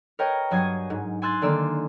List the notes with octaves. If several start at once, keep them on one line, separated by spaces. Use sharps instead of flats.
A#4 B4 C#5 D#5 G5
G2 F#3 G#5 D#6 G#6 C7
G#2
G#5 C6 E6 F#6 A6
D3 D#3 A#3 D5 E6